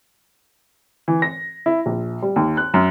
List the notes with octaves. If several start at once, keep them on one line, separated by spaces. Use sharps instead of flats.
E3
A#6
E4
A#1
G3
D#2
F#6
F#2